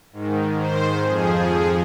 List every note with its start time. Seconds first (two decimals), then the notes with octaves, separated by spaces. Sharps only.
0.13 G#2 D#3
0.58 C5
1.04 F2 F3 G#4